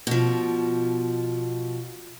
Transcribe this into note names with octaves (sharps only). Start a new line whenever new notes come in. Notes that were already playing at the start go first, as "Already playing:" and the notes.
B2 F3